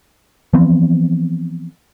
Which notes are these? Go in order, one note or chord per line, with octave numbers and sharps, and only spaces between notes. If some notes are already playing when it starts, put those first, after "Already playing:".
E3 F3 B3 C4